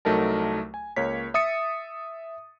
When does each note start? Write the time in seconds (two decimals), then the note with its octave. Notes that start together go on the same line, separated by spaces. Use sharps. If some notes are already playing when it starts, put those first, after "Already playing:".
0.05 C2 F#3 A3 D#4 A#4 A5
0.74 G#5
0.96 C#2 A#3 C#5 B6
1.34 E5 D#6 A6 C#7